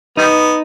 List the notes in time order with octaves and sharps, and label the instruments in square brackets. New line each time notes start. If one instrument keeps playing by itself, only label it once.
[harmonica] D#3 G3 B3 [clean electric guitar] D#4